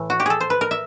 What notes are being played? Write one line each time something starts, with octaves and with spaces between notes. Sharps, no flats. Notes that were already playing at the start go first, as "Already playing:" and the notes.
Already playing: A2 E3 A3
F#4
G4
G#4 A4
C5
B4
A#4
E5